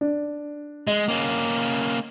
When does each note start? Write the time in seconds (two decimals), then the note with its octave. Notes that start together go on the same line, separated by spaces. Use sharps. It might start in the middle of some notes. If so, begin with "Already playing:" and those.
0.01 D4
0.87 G#3 D#5
1.09 A#3 C#4